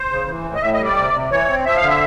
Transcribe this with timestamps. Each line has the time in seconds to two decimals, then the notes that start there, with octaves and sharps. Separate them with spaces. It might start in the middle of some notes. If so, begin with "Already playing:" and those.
Already playing: C5
0.10 C#3
0.27 E3
0.44 A2
0.55 D#5
0.61 A2 E5
0.74 D#5
0.79 G3
0.85 D5
0.97 C3
1.13 C3
1.30 E3 C#5
1.48 C4
1.65 F3 E5
1.77 F5
1.82 D3
1.88 E5